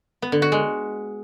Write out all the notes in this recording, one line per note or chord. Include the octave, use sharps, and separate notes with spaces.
B3
D3
F#4
G#3